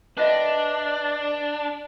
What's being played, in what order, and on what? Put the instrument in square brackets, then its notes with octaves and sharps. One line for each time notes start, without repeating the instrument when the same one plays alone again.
[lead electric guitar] D4 [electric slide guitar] B4 D#5 E5